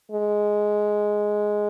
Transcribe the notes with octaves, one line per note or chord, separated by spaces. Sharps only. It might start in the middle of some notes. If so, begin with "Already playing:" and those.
G#3